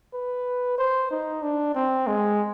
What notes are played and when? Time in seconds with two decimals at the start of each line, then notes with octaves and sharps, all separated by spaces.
0.14 B4
0.78 C5
1.11 D#4
1.42 D4
1.75 C4
2.07 G#3